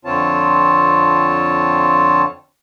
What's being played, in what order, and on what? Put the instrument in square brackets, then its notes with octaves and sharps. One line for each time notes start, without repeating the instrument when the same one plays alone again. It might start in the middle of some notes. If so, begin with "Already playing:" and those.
[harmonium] F2 D3 C4 F4 C#5 A5